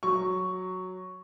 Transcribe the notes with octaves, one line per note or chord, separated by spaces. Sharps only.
F#3 C#6